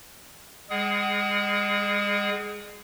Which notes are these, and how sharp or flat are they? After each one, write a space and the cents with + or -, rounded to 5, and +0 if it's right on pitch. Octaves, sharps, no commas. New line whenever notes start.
G#3 -35 G#4 +15 F#5 +35